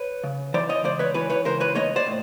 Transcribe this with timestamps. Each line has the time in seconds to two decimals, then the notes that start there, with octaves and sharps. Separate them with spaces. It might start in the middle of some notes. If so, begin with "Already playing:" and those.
Already playing: B4 C#5
0.24 C#3
0.54 E3 C5 D5
0.69 C#5 D#5
0.84 C#2 C5 D5
0.99 B4 C#5
1.14 E3 B4 C#5
1.30 B4 C#5
1.45 C#2 A#4 C5
1.60 B4 C#5
1.75 A#3 C#5 D#5
1.96 C5 D5
2.06 A2